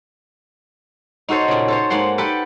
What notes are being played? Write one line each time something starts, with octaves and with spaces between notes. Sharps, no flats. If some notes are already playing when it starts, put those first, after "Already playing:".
D#4 F#4 A4 C5 C#5
A#2 C#3
A4 C5 C#5
G#2 A#3 F#5 C6
G4 A4 B4 F#5 G5